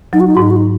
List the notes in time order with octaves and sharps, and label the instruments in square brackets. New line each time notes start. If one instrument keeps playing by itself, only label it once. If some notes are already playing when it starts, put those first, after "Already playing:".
[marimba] F#3 [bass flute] D#4
[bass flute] F#4
D#4
[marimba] G#2 [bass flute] F#4
[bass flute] D#4
F#4
D#4